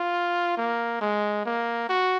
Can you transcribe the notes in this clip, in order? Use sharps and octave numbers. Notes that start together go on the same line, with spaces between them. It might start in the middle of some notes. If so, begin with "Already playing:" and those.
Already playing: F4
A#3
G#3
A#3
F#4